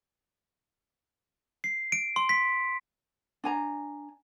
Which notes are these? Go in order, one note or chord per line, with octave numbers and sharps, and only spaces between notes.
C7
D7
C6
B6
D4 G#5 A#5